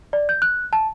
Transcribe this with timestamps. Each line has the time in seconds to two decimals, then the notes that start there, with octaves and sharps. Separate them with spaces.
0.13 D5
0.29 G6
0.42 F#6
0.73 A5